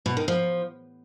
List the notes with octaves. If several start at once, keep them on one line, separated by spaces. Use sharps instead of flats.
B2
D#3
F3